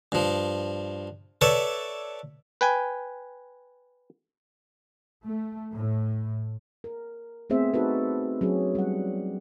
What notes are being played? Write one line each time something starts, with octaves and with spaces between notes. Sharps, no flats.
G2 F3
A4 B4 C#5 D5 E5
B4 G5 G#5
A3
A2
A#4
A3 B3 C4 G#4 C5 E5
D#4 F#4 A4 B4
F#3 C#4 F#4 G#4
G3 F#5